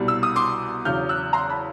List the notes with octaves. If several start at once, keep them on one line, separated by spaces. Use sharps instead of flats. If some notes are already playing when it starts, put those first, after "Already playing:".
Already playing: C2 B2 G3
E6
D#6
C6 D6
E2 C#3 F#3 F6 G6
E6 F#6
A#5 C6
A5 B5